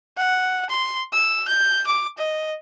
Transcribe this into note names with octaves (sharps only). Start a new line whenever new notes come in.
F#5
C6
E6
G6
D6
D#5